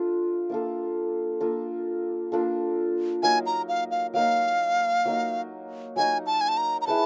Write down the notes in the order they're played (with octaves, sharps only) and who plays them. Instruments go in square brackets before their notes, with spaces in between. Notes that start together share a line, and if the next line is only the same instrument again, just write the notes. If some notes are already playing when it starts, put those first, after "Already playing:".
Already playing: [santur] D4 F4 A4
A#3 D4 F4 A4
A#3 D4 F4 A4
A#3 D4 F4 A4
[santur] F#3 A#3 D#4 [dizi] G#5
[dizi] A#5
F5
F5
[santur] F#3 A#3 D#4 [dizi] F5
[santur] F#3 A#3 D#4
[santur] F#3 A#3 D#4 [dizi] G#5
[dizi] A5
G#5
A5
A#5
A#5
[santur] E4 G#4 B4 [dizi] A5